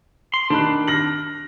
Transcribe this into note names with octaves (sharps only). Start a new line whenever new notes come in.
C6
D#3 D4 B5 F#6
F6 A#6 F#7